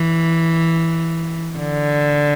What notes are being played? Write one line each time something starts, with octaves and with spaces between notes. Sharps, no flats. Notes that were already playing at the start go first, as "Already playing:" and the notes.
Already playing: E3
D3